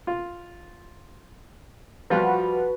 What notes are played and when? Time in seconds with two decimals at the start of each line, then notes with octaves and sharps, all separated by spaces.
0.07 F4
2.10 F3 G3 F4 F#4 B4